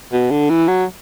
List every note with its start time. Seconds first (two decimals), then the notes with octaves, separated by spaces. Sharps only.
0.12 B2
0.31 D3
0.50 E3
0.68 F#3